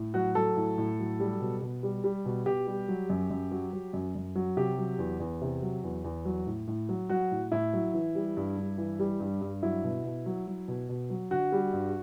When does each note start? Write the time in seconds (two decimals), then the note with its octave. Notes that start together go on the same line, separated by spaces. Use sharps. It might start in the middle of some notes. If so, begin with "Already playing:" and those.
Already playing: A2
0.14 F#3 F#4
0.35 F#3 A4
0.57 A2
0.78 A2
0.99 F#3
1.20 G3
1.41 B2
1.62 B2
1.83 G3
2.04 G3
2.25 B2
2.46 B2 G4
2.67 G3
2.88 F#3
3.10 F#2
3.30 F#2
3.52 F#3
3.73 F#3
3.93 F#2
4.15 F#2
4.35 F#3
4.57 C3 G4
4.78 F#3
4.99 E2
5.20 E2
5.42 C3
5.62 F#3
5.84 E2
6.04 E2
6.25 F#3
6.47 A2
6.67 A2
6.89 F#3
7.09 F#3 F#4
7.31 A2
7.52 A2 E4
7.73 F#3
7.94 E3
8.15 G3
8.37 G2
8.57 G2
8.78 E3
8.99 G3
9.20 G2
9.41 G2
9.63 F#3 E4
9.84 B2
10.04 B2
10.26 F#3
10.47 F#3
10.68 B2
10.89 B2
11.10 F#3
11.31 D3 F#4
11.52 G3
11.73 G2